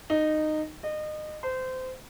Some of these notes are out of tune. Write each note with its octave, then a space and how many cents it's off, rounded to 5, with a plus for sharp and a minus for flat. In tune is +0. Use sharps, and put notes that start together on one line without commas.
D#4 -15
D#5 -30
C5 -25